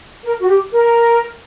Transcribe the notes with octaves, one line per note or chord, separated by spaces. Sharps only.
A#4
F#4
G4
A#4